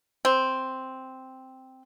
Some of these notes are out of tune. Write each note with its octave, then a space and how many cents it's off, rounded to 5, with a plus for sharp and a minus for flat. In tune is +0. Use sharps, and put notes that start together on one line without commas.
C4 +0